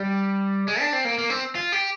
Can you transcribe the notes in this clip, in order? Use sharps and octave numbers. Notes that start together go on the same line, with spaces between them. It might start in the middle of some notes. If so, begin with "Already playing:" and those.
Already playing: G3
G#3
D4
C4
A#3
A#3
C4
F4
G4